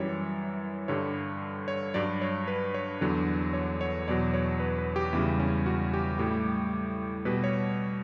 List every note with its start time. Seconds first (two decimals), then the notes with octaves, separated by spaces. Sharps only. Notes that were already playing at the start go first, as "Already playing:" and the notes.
Already playing: F#2 E3 G3 C#5
0.88 G2 D3 G3 C#5
1.68 C#5
1.94 G2 F#3 D5
2.22 C#5
2.47 B4
2.74 C#5
3.01 E2 D3 F#3
3.53 C#5
3.81 C#5
4.08 E2 B2 F#3 D5
4.34 C#5
4.60 B4
4.79 B4
4.96 G4
5.13 E2 C#3 G3 E4
5.40 C#4
5.66 F#4
5.94 G4
6.19 A2 G3 G4
7.25 B2 G3 B4
7.44 C#5